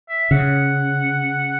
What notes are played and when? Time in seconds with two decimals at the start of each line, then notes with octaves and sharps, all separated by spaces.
0.09 E5
0.31 C#3 F#5